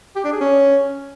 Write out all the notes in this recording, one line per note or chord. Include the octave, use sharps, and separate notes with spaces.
G4
D4
G#4
C#4